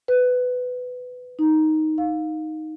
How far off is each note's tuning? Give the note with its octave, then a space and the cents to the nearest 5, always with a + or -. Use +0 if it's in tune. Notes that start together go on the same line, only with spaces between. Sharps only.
B4 +15
D#4 +5
F5 +20